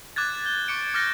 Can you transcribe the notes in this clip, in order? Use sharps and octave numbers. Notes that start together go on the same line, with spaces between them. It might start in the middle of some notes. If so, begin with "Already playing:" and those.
D6 F#6 G#6 A6
D6 G6 G7
C#6 D6 C#7 D7
D6 F6 G6 A6 A#6 C#7